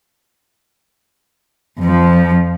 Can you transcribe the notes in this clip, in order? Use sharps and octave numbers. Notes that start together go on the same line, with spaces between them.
F2 F3